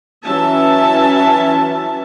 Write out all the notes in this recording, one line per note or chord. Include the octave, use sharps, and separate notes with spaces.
E3 F#3 C#4 E5 A5